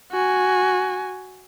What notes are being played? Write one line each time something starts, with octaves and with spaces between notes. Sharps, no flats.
F#4 G#5